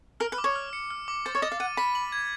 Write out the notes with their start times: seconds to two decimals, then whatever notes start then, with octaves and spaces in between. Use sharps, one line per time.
0.20 A#4 F6
0.32 B4
0.38 D6
0.44 C#5
0.56 F6
0.73 C#7
0.90 F6
1.08 D6
1.25 C5 A6
1.35 C#5
1.42 D#5 A6
1.52 F5
1.60 F#5 D#7
1.77 B5 B6
1.95 F#7
2.12 G#6